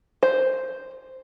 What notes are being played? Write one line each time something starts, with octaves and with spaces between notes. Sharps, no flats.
C5